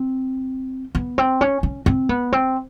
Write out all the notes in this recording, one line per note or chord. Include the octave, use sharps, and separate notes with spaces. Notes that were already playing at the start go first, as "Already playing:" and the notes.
Already playing: C4
B3
C4
C#4
C#4
C4
B3
C4